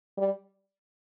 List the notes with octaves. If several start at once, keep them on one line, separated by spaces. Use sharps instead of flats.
G3